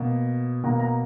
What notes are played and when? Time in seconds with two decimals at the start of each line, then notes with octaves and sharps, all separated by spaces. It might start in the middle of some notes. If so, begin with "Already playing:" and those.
Already playing: B2 A#3 F#5
0.64 B2 A#3 F#5 A#5
0.80 F#5 A#5